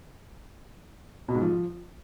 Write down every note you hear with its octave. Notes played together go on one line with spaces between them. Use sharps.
B2
G#2
F3